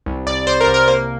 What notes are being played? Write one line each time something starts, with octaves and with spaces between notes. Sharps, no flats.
C2
C2 D5
C2 C5
A#4
C2
A#4
A#3 C5